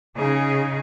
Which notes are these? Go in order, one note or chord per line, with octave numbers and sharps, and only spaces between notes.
C#3 D#4 G#4